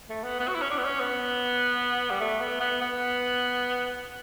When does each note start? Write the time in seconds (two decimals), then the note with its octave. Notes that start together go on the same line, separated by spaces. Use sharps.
0.09 A3
0.24 B3
0.39 B3
0.48 F#4
0.54 E4
0.62 C#4
0.70 D4
0.78 B3
0.85 C#4
1.00 B3
2.10 G3
2.21 A3
2.41 B3
2.60 B3
2.81 B3